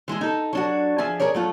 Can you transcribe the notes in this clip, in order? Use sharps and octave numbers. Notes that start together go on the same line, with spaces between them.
E3 G#3 E4 G#4
D#4 A4
F#3 D4 F#4
F3 G#4 E5 G#5
G#4 A#4 C#5 D5
F#3 A3 F4